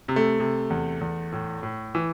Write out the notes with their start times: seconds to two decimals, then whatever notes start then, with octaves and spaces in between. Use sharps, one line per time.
0.08 C3
0.16 A3
0.40 C3
0.70 E2
1.01 E2
1.32 A2
1.63 A2
1.95 E3